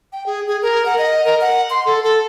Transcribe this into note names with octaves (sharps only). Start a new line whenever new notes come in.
G5
G#4
G#4
A#4
F#5
D#5
A#4
F#5
C6
A4
A4